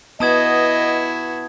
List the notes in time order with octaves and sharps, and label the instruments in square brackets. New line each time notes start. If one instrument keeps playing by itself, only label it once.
[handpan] B3 [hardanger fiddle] E4 F#4 [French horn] D#5 [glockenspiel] A5 D#6 G#6